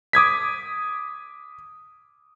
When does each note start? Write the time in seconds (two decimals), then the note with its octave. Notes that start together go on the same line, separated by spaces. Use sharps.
0.13 D6 D#6 G#6 B6